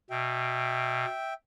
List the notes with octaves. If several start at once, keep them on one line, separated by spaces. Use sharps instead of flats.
B2 E5 G5